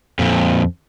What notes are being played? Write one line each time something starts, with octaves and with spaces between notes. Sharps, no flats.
F2 A#2